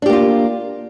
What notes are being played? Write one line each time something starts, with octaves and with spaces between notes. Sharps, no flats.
A#3 D4 F4 G4